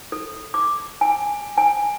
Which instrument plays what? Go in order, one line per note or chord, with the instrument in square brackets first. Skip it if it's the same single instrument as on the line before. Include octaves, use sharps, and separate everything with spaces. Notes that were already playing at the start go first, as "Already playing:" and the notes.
[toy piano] A4
D6
G#5
G#5